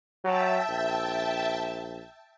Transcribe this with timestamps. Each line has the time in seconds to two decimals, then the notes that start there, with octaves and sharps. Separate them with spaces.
0.25 F#3 E5 G5 A5
0.69 A#1